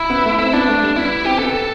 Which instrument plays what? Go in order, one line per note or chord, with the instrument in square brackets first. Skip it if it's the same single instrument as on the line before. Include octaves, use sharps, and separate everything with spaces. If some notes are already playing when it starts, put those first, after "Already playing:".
Already playing: [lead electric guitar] E4
[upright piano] B3
A3
[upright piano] C4 [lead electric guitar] E4
[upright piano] B3 [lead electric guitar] D4
[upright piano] A3
G3
[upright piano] B3 [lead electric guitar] E4
[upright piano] C4 [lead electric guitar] G4
[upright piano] B3 [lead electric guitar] A4
[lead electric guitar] A4